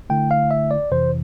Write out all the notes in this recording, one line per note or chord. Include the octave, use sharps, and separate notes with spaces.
D3 A3 E4 G5
F5
E5
D5
F2 C3 E3 C5